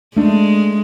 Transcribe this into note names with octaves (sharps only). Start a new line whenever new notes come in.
G#3 A3 D4